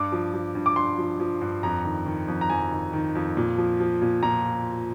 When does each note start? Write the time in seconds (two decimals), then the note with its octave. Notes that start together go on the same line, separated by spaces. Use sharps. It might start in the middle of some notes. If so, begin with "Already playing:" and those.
Already playing: G2 D6
0.12 F3
0.34 F3
0.55 G2
0.66 D6
0.76 G2 C6
0.98 F3
1.20 F3
1.41 G2
1.63 F2 A#5
1.85 D#3
2.06 D#3
2.28 F2
2.41 A#5
2.50 F2 G#5
2.71 D#3
2.93 D#3
3.15 F2
3.37 A#2
3.58 F3
3.80 F3
4.02 A#2
4.23 A#2 A#5